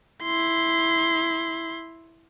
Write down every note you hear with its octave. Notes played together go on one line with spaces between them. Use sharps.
E4 C6